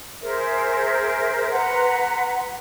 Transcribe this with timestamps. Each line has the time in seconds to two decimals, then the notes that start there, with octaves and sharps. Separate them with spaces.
0.22 G#4 A#4 C5 E5
1.51 B4 F#5 A#5 C6